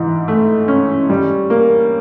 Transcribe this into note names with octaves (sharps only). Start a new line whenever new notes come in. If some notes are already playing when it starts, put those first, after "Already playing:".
Already playing: G#2 E3
A3
C#4
G3
A#3